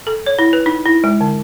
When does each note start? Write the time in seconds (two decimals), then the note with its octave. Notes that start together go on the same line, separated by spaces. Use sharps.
0.07 A4
0.26 C#5
0.39 E4
0.53 B4
0.66 D#4
0.86 E4
1.04 G#3
1.21 D3